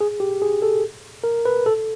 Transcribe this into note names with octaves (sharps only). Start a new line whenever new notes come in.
G#4
G4
G#4
A4
A#4
B4
A4